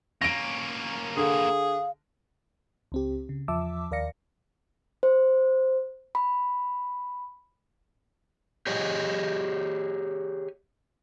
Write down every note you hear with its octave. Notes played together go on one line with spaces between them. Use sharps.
A#3 C#4 A#6 D7
D3 G#4 F5
C#2 C4 G4
C#3
E2 F3 E5 A5 D6 E6
D#2 A#4 D5 F5 A#6 C#7
C5
B5
G4 G#4 C#5 D#5 G#5